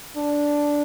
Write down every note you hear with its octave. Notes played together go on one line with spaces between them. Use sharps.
D4